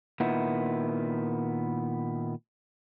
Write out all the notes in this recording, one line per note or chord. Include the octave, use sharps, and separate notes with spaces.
A#2 D#3 B3 E4